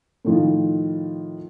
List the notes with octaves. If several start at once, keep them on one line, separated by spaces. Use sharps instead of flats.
A2 D#3 F3